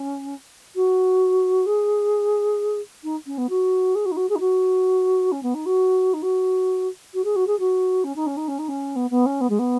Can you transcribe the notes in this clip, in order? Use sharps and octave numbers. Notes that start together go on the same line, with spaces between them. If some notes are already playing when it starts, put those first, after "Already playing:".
Already playing: C#4
F#4
G#4
D#4
C#4
B3
F#4
G#4
F#4
D#4
F#4
G#4
D#4
F#4
C#4
B3
D#4
F#4
D#4
F#4
F#4
G#4
F#4
G#4
F#4
C#4
D#4
C#4
D#4
C#4
D#4
C#4
B3
B3
C#4
B3
G#3
B3